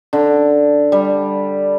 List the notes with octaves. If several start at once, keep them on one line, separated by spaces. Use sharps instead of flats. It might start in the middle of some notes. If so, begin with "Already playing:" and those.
D3
G3